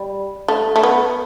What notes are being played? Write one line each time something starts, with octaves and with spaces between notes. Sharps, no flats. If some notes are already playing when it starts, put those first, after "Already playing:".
Already playing: G3
A3
A3
B3